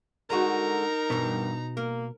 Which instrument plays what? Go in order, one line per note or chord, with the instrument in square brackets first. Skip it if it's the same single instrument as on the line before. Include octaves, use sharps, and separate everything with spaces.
[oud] D3 G#3 F#4 [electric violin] D#4 A#5 [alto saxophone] A#4
[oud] E2 G2 [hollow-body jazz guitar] B2 B3
[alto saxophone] A#3 [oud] A#4